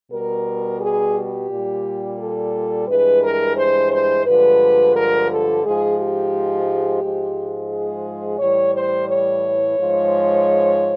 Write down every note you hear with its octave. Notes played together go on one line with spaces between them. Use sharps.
B2 G3 A#4
G#4
G4
A#2 G3
A4
G2 E3 G#3 B4
A#4
C5
C5
G2 D3 F3 G#3 B4
A#4
A4
G#2 F3 G#3 G#4
G4
G#2 F3 G#3
G#4
A2 E3 G3 C#5
C5
C#5
G#2 F3 G#3